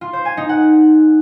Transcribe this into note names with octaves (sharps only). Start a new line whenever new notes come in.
F4
C5
G#5
D#4
F#5